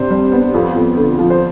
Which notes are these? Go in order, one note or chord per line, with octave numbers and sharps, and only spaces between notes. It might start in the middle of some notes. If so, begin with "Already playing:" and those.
Already playing: C3 D4 C5
G3
B3
F2
F2
D3
F3
C5